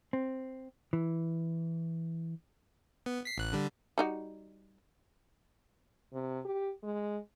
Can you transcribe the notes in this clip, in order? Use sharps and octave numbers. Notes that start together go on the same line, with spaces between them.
C4
E3
B3
B6 C7
A1 F#6
D3 G3
G3 D#4 F#4
C3
G4
G#3